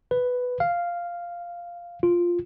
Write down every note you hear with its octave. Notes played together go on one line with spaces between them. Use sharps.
B4
F5
F4